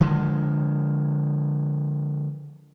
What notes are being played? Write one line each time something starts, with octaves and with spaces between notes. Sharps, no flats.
D3 F3 G#3